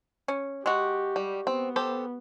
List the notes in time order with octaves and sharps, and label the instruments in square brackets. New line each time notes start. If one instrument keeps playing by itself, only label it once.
[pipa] C#4
[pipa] G#3 F#4 [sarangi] G4
[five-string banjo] G3
[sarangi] B3 [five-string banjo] C4
[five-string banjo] G4 A4 C5